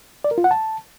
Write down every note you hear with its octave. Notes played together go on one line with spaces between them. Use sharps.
D5
A#4
F4
F#5
A5